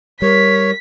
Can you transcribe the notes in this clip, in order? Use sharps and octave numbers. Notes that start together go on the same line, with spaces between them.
G3 A#4 C#5 B6